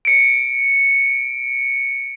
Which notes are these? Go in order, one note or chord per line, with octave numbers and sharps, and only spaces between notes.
C#7 D7